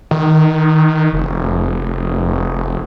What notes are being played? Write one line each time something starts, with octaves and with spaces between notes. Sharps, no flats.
D#3
F1